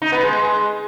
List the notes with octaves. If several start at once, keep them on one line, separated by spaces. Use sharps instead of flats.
D#4
B3
G#3